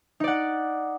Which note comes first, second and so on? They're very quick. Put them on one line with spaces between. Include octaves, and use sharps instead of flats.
D#4 D5 F#5